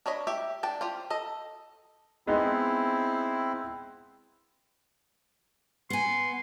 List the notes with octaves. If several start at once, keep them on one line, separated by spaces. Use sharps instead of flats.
D4 C#5 D#5 B5
G4 E5
D4 G5 A5
F4 G4 C5
A4 D#5
G#3 B3 C4 D#4 E4
B3 G#5 C6